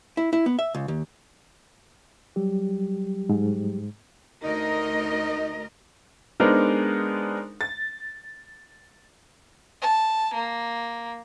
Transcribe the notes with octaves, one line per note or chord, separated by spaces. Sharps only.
E4
E4
B3
E5
C#2
D#2
F#3 G3 G4
G#2
D2 D#4 A#4 D#5
G#3 B3 D4 D#4 A#4 C5
A6
A5
A#3